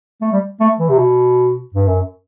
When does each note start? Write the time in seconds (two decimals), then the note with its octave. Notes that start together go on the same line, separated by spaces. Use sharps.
0.21 A3
0.32 G3
0.60 A3
0.79 E3
0.89 C3
0.98 B2
1.75 G2
1.87 F#2